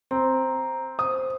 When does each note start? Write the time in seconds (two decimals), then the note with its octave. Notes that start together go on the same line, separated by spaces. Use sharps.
0.11 C4 A#5
0.99 C5 D#6